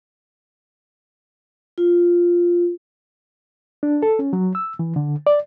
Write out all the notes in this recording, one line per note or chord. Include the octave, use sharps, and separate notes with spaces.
F4
D4
A4
C#4
F#3
E6
E3
D3
D5